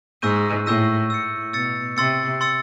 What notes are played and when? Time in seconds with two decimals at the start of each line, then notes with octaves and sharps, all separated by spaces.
0.22 G#2 C#6 E6 G6 A#6 D#7
0.66 A2 C#6 E6 G6 A#6 D#7
1.10 A2 E6 A6 C#7
1.53 B2 E6 A6 C#7
1.97 C3 C6 E6 A6 C#7
2.41 C6 E6 A6 C#7